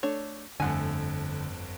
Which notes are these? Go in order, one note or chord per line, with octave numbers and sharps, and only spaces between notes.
A3 D4 C#5
G1 F2 D3 A3 F#5 G#5